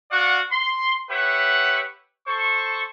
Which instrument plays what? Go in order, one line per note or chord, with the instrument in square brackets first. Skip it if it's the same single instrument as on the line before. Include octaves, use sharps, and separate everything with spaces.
[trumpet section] F#4 D5 F5 F#5
C6
G4 B4 C#5 E5 F#5
A4 C5 C#6